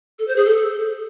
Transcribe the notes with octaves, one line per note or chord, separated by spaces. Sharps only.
A4
C5
G#4
A4